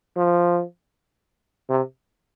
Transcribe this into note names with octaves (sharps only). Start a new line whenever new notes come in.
F3
C3